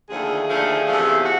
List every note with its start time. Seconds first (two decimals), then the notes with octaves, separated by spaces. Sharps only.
0.09 D#2 D3 F3 A3 G#4
0.48 D#2 D3 F3 A3
0.86 E2 C3 F3 A3
1.25 F#4